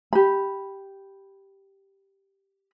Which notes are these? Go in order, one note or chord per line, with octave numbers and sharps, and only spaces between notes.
G4 B5